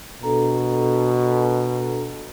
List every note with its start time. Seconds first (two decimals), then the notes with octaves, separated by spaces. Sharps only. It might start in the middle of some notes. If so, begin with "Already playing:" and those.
0.23 B2 D4 A4 A#5